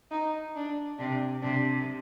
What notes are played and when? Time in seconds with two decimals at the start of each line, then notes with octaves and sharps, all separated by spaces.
0.11 D#4
0.56 D4
0.98 C3 D4
1.42 C3 D4